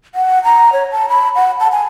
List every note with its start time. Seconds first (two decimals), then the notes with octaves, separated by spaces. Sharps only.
0.15 F#5
0.44 A#5
0.73 C#5
0.92 A5
1.09 B5
1.35 F#5
1.60 A5
1.72 G#5